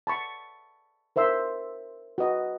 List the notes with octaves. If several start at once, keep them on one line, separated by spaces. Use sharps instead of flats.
A5 B5 C#6
A#4 C5 E5 C6 E6
F#4 B4 D#5